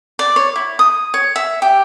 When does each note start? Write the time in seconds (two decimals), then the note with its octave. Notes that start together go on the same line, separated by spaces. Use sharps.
0.19 D5
0.36 C#5
0.56 E4
0.79 D#6
1.14 C#5
1.36 E5
1.62 G4